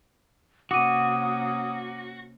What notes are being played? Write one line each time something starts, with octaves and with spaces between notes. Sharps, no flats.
C3 A#3 C#4 F#4 D6 D#6 D#7